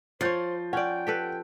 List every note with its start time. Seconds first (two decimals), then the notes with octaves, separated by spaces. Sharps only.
0.21 F3 F4 C5 C#5 G6 A6 C7
0.73 C#4 D5 F#5 G5
1.07 G4 A4 B4